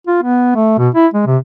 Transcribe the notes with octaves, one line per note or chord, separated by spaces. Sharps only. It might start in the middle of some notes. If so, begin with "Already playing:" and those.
F4
B3
A3
B2
E4
G#3
C3